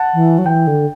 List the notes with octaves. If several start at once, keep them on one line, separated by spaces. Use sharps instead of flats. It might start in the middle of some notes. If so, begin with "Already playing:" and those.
Already playing: F#5 A5
E3
F#3
E3 G5
D3